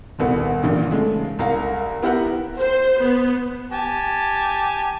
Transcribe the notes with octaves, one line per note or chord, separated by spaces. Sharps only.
D#1 C2 B3
G#1 G2 A#2 C#3 E3
C#3 G#3 A3
C2 A#4 F5
B3 E4 G4 A#4 B4 F#5
C5
B3
G4 G#5 A5